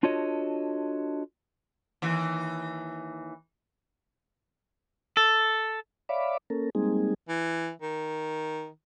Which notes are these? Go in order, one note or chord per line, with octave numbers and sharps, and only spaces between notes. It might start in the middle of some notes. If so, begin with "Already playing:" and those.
D4 F4 F#4 A4 C#5 D#5
D#2 E3
A4
C#5 D5 E5 F5 B5 D6
A#3 C#4 A4 A#4
G3 G#3 A#3 C4 D#4 G#4
E3
D#3